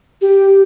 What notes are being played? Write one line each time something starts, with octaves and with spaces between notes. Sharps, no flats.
G4